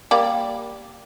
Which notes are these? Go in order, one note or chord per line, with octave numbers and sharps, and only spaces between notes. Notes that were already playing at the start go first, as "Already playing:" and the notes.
G3 A#3 D5